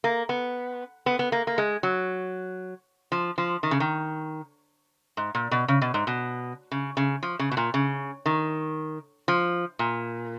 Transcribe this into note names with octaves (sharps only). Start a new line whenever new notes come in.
A#3
B3
B3
B3
A#3
A#3
G#3
F#3
F3
F3
D#3
C#3
D#3
G#2
A#2
B2
C#3
B2
G#2
B2
C#3
C#3
F3
C#3
B2
A#2
C#3
D#3
F3
A#2